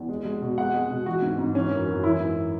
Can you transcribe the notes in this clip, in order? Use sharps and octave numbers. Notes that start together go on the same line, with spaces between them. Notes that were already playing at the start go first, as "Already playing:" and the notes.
Already playing: E2
G#3
G#3
B2
G#3 F#5
G#3
B2
E3 F#4
G#2
G#2
E3 C#4
F#2
F#2
E3 E4
G#2